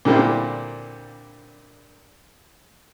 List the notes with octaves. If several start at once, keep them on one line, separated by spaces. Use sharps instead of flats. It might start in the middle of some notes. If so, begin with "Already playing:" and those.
A#2 D3 G3 A#3 C4 E4